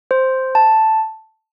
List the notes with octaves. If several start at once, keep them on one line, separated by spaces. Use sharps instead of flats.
C5
A5